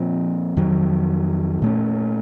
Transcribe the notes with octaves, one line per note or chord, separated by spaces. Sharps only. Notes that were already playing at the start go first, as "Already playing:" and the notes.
Already playing: A#2 F3 C4
F2 D#3 F#3
A#2 A3 C#4